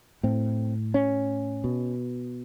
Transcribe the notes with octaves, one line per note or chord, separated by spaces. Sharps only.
A2 C4
C#4
B2